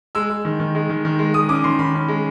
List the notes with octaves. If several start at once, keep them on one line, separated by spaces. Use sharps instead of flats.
G#3 E6
G#3
D#3
D#3
G#3
D#3
D#3
G#3
G#3 D#6
C#4 D6
D#3 C6
D#3 B5
C#4
G#3